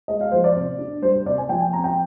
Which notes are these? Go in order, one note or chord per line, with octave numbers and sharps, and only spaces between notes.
G#3 D#5
F5
F3 C5
D5
C3
D4
G3 C5
C5
C3 D5
G#5
F3 G5
G#5
C4 A#5
G5